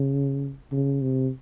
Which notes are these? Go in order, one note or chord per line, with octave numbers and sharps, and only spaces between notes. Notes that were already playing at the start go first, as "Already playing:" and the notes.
Already playing: C#3
C#3
C3